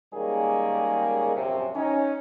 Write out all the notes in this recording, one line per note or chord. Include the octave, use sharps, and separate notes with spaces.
D#3 G3 G#3 A#3 C#4 G#4
A#1 F#2 C3
C#4 D#4